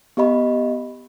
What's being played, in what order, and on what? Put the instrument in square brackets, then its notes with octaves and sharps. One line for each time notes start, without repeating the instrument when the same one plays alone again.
[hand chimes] B3 G4 D#5 B5